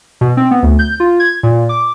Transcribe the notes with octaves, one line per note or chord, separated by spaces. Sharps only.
B2
C4
B3
D2
G6
F4
G#6
A#2
D6